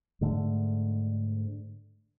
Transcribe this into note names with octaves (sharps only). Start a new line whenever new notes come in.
G#2 D3 A3